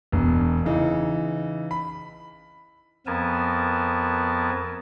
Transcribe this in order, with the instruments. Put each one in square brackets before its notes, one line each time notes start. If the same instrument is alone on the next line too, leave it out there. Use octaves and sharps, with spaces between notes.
[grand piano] E1 B2
C#3 E3 D#4
B5
[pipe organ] F2 F3 B3 A#4 G#5 A5